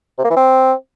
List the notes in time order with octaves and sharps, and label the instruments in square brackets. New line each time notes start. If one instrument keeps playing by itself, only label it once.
[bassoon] C3
A#3
E3
C4